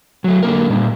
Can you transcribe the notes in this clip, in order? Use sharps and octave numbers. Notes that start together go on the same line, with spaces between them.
F#3 A3
D3 A#3 A#4
A#2 G3